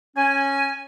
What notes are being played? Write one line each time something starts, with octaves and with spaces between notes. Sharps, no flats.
C#4 G#5